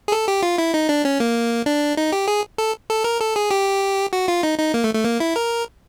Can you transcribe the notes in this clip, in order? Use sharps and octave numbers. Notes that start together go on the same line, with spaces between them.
G#4
A4
G4
F4
E4
D#4
D4
C#4
A#3
D4
D#4
G4
G#4
A4
A4
A#4
A4
G#4
G4
F#4
F4
D#4
D#4
A#3
A3
A3
A#3
E4
A#4